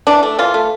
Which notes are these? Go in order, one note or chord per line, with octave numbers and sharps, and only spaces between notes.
E3 D4
A3
E3 F4
A3